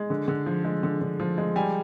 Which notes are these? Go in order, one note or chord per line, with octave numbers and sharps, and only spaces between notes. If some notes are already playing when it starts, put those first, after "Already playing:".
Already playing: G#3
D3
D3
F3
G#3
D3
D3
F3
G#3
G3 G#5